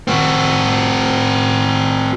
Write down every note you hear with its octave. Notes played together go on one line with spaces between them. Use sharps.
C4 F#4